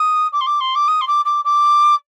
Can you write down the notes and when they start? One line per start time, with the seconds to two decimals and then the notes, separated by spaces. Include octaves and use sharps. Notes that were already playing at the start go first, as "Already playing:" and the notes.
Already playing: D#6
0.33 D6
0.41 C6
0.47 D6
0.60 C6
0.75 D6
0.88 D#6
1.01 C6
1.07 D6
1.25 D6
1.45 D6